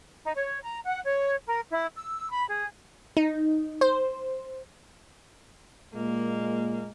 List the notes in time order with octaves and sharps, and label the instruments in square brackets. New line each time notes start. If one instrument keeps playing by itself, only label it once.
[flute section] D#4
C#5
A#5
F#5
C#5
A#4
E4
E6
B5
G#4
[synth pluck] D#4
C5
[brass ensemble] A#2 G#3 [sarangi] A#3